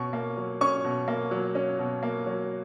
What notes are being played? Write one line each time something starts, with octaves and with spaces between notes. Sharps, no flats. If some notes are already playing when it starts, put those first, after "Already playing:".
Already playing: B2 C#4 C#6
A#3
F#3
C#4 C#6
B2
A#3
F#3
C#4
B2
A#3
F#3